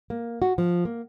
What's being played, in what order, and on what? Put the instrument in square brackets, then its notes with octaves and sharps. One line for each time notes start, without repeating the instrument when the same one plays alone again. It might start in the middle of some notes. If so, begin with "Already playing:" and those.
[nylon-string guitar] A#3
F#4
F3
A#3